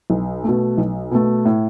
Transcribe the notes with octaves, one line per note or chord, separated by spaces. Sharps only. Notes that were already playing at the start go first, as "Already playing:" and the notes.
B1
B2 A3
B1
B2 A3
A2